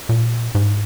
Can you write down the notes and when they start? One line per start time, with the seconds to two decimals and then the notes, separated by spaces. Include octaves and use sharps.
0.09 A#2
0.55 G#2